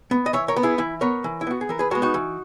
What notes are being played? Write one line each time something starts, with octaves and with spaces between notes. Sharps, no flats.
B3
D#5
E3 C#5 E5
A#4 C#5
B3
E4 G#4
E3 E4
B3 A#4 C#5
E3
E4
B3 F#4
G#4
E3 A#4
G#4 B4
G#3 B3 F#4 A#4
D#4 F#4
E3